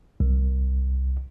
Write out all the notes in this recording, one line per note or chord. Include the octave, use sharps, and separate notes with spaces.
C2